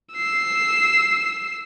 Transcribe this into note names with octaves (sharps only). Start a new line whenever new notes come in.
E6 C7